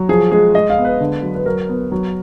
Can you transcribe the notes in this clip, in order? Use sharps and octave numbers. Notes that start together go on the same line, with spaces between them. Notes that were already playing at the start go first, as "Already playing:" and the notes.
Already playing: F#3
F3 G#4
G#3 G#4
G#3 D#5
F5
B3
B4
D3
F#3
B4
F#3 A#4
B3
F#3